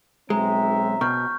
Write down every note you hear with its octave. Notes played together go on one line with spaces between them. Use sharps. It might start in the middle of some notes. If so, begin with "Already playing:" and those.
B1 G#3 C4 E5 A#5
B2 C#6 F6 G6